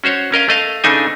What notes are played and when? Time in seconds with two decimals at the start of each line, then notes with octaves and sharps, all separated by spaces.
0.04 C#4 F#4 C5 C#5
0.32 C#4 A#4 D#5 F5
0.49 A3 D#5 F5
0.84 C#3 A3 D4 D#4 C5 G#5